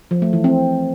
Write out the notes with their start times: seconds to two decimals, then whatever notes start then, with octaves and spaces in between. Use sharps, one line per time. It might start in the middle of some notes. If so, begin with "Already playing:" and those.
0.11 F3
0.22 A3
0.33 E3
0.44 C4